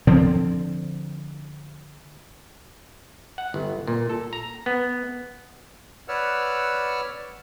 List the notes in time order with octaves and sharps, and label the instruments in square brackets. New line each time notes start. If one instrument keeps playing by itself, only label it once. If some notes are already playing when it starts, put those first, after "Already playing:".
[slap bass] D3 F3 C4
[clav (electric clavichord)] F#5
G1
A#2
A4
A#5
B3
[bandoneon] B4 C#5 D5 F#5 E6 F6